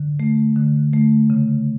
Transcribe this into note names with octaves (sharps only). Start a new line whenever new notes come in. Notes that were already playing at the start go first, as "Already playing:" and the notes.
Already playing: D3
A3
D3
A3
C#3